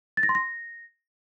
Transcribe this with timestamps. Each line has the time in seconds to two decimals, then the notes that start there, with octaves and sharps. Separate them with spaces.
0.17 A6
0.23 A#6
0.29 C6
0.35 A#6